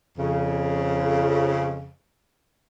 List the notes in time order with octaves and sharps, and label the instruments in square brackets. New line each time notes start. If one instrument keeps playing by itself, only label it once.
[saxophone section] F2 C#3